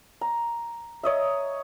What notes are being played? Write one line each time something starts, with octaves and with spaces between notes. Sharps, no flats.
A#5
C#5 D#5 E5